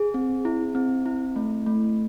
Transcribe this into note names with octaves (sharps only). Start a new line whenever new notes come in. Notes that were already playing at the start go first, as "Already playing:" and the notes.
Already playing: G#4
C4
E4
C4
E4
A3
A3